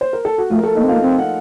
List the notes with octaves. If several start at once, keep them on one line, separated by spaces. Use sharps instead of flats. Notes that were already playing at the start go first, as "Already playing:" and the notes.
C5
A#4
A4
F#4
F3 A3 F4
A#4
A3 A4
A#3 D#4 D#5
C4
F4 F5
A#3
C4
F#5